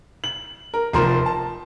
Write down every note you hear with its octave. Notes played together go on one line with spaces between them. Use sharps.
F#7
A#4
F1 F3 A#4 C6
A5